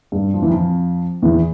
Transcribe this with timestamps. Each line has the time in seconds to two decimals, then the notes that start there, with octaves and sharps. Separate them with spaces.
0.12 G2 G3
0.34 F3
0.42 E3
0.50 F2 F3
1.22 E2 E3